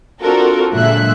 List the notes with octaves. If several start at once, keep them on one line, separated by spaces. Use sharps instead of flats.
C4 D4 F4 F#4 A4 A#4
A#2 D3 F#3 G#3 E5 F#6